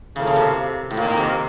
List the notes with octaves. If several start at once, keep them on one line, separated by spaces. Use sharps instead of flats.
A2 C#3 F3 A#3 F4 A4
C#3
C3
A2
F2 A#2 D#3 A#3
C3